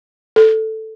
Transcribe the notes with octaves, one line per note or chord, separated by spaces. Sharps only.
A4